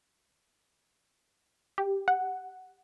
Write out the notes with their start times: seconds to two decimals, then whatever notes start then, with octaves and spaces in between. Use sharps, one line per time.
1.78 G4
2.08 F#5